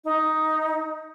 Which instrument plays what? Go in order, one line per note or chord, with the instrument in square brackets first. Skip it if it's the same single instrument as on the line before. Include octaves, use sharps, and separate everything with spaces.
[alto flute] D#4